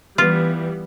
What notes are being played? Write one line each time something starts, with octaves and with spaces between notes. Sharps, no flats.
E3 G3 B3 F4